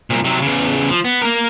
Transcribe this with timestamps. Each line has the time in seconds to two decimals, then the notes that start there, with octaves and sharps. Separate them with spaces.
0.10 C2 A#2
0.25 C3 F#3
0.42 E2 C#3
0.90 F3
1.05 B3
1.21 A#3 A#4